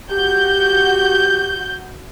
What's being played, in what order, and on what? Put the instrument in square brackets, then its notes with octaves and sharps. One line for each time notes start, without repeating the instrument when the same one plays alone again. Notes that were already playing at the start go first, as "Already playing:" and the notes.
[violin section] F#4 G6 [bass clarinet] G4